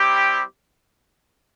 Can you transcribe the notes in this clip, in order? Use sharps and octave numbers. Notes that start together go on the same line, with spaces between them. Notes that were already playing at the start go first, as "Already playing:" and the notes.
Already playing: G3 C4 E4 G4
G5